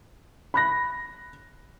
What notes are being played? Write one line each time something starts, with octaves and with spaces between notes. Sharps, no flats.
B5 F#6 A#6